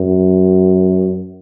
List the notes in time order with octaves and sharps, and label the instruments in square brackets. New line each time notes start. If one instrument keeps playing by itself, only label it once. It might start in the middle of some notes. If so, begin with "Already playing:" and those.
Already playing: [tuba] F#2